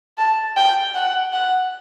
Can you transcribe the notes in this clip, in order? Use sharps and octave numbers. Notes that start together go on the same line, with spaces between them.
A5
G5
F#5
F#5